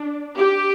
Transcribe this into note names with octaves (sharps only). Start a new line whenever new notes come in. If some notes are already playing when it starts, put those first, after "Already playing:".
Already playing: D4
G4